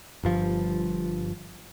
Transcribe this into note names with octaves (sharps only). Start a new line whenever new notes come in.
G1 G2 F3